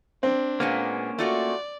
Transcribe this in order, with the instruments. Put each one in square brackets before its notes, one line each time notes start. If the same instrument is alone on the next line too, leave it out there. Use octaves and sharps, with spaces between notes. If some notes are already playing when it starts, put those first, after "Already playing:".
[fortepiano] C4 [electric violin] D4
[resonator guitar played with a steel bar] A#2 G#3 B3 [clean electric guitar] A#3 C#4
[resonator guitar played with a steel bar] A3 F4 F#4 [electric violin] D5